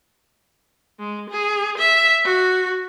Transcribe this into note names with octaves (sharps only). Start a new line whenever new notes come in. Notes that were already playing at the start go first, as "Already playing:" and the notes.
G#3
G#4
E5
F#4